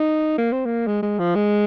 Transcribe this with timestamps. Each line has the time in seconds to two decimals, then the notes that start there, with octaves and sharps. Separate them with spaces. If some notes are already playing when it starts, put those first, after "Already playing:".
Already playing: D#4
0.38 A#3
0.52 C4
0.66 A#3
0.87 G#3
1.03 G#3
1.19 F3
1.35 G#3